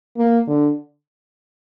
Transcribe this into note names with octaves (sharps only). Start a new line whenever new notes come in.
A#3
D3